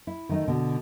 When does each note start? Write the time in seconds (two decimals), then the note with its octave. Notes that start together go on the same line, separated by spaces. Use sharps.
0.07 E4
0.29 D#3 A3 D#4
0.47 B2 D3